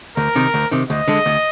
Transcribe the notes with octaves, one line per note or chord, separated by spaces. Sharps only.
D2 A#4
C3 D#3
D2
C3 D#3
D2 D#5
D3 G#3
D2